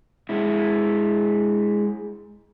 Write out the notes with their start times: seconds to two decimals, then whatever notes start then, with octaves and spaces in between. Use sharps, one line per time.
0.29 G#3 E4